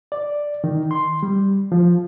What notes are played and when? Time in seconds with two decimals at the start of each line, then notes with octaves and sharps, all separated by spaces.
0.12 D5
0.64 D#3
0.91 C6
1.23 G3
1.72 F3